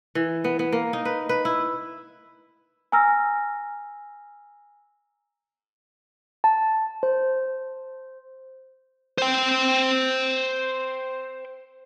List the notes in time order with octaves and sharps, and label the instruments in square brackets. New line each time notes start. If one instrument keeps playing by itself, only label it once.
[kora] E3
B3
B3
A#3
D#4
B4
B4
E4
[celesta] G#5 A#5 E6 F6 A#6
[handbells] A5
C5
[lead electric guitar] C5 G5